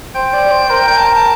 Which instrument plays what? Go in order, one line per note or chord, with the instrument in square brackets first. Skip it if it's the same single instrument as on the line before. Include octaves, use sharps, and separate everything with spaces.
[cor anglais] C5 [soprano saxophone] G5
[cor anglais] D5
C5
A#4
[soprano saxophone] G5
A5
A5